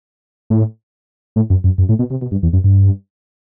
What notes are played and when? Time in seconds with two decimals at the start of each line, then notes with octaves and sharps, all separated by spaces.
0.50 A2
1.36 A2
1.50 F#2
1.64 F#2
1.78 F#2
1.89 A2
1.99 B2
2.10 C3
2.21 B2
2.31 G2
2.43 E2
2.53 F#2
2.64 G2